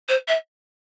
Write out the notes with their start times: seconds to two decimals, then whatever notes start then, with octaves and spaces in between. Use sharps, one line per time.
0.08 C5
0.28 E5